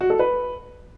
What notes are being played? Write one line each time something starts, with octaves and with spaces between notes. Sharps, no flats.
F#4
A4
B4